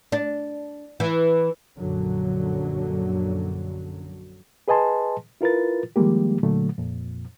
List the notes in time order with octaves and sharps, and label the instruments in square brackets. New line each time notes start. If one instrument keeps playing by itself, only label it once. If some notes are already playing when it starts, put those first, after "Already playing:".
[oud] D4
E3
[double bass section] A#1 F#2 D3 F#3
[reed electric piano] G#4 B4 D#5 G#5 A5 C6
E4 F4 A#4 B4 A6
D#3 F3 G3 G#3 A#3 G4
A#2 D3 F#3 A3
F2 A#2